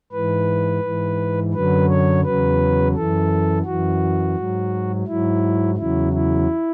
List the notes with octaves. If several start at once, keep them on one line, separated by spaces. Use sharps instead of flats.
G#2 E3 B4
G#2 E3
F#2 D3 F#3 B4
C#5
E2 C#3 F#3 B4
F#2 E3 A4
F#2 E3 F#4
G#2 F#3
G#2 F#3 E4
E2 C#3 F#3 E4
E4